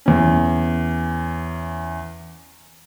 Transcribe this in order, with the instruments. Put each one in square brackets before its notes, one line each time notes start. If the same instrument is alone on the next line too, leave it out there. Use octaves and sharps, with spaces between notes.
[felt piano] E2 C#4